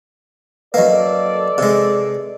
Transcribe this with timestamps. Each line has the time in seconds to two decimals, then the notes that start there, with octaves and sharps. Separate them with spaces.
0.74 F#2 A#3 A4 B4 D5 D#5
1.58 C3 G#3